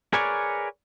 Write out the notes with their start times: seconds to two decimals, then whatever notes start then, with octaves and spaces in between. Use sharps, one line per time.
0.13 G#4 A#4 B4 C#5 D5 G#5